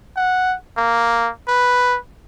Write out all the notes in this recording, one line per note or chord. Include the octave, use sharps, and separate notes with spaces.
F#5
A#3
B4